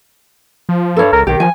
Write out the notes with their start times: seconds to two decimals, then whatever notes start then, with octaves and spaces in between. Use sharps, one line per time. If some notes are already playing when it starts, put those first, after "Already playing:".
0.69 F3
0.96 G2 A4 C#5
1.13 C#2 A#4
1.27 B1 D#3 G4
1.40 F3 G#5